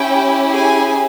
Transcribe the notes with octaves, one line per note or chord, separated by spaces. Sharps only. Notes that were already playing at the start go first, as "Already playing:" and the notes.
Already playing: C#4 E4 G4 G5
G#4 G#5